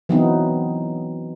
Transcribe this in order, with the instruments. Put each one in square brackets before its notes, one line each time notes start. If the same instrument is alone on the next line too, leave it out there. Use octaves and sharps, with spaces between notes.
[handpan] E3 F#3 B3 C4 D#4